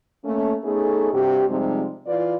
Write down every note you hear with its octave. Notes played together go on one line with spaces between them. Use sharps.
A3 A#3 C#4
A3 B3 C#4 D#4 G#4 A4
G2 C3 F#4 G4
C3 F3 G3 G#3 C4 D#4
E3 F4 B4 D5